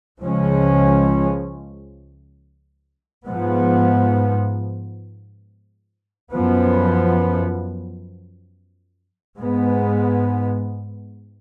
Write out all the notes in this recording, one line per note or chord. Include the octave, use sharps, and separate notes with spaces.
C#2 C#3 F3 G#3 C#4
G#2 F3 B3
F#2 F3 B3
G#2 G#3 B3